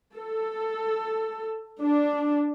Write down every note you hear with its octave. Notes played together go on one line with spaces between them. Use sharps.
A4
D4